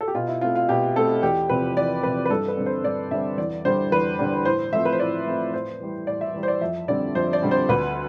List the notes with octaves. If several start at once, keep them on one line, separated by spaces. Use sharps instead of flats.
A4
G4
B2 F4
E4
A3 C4 F4
F4
B2 G4
A3 C4 A4
E2 G4
C3 F3 C4 B4
E2 D5
C3 F3 C4 B4
B4
G2 A4
B4
D3 G3 C4
C5
G2 D5
D3 G3 C4 E5
E2 D5
D3 G3 C5
E2 B4
D3 G3
A2 C5
F3 A3 C4 E5
B4
C5
A2 D5
F3 A3 C4
A2 C5
E3 G3
A2 D5
E5
E3 G3
C5
D5
F2 E5
D3 G3 C4 D5
F2 C5
D5
D3 G3 C4
C5
D2 B4